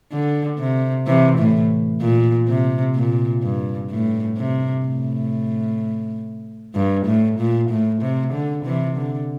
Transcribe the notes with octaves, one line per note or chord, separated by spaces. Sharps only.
D3
C3
C3 E3
A2
A#2
C3
A#2
G2
A2
C3
A2
G2
A2
A#2
A2
C3
D3
C3 E3
D3